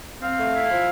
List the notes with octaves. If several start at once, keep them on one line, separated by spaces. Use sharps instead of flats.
C4 F5
A3
E4
F3